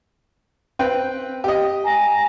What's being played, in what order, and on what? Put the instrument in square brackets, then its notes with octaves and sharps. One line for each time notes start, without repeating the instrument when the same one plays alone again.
[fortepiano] C4 B4 G5
G4 D#5
[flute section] G#5 A#5